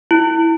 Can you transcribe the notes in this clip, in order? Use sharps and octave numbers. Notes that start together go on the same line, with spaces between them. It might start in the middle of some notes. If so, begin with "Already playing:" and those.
E4